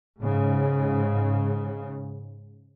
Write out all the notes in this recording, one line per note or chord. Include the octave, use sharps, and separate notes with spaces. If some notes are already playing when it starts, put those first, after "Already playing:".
G#2 C#3